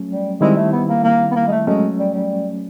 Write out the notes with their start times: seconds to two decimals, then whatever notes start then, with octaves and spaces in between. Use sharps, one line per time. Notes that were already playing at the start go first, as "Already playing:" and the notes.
Already playing: F#3 A3 C#4
0.10 G3
0.41 D#3 G3 G#3 C4 E4
0.57 A3
0.72 B3
0.89 A#3
1.04 A#3
1.31 B3
1.36 A#3
1.47 G#3
1.52 A3
1.67 F#3 G#3 A3 C#4
1.99 G3
2.14 G3